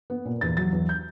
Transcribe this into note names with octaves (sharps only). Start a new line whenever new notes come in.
B3
A#2
E2 A6
F#3 A6
E2
G6